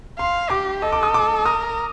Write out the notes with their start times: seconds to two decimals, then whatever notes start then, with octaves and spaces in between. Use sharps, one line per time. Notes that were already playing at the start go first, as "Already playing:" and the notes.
0.18 F5 C6
0.50 G4 D6
0.82 A4 D#5
0.92 D6
1.03 D#6
1.14 D6
1.45 A#4 D#6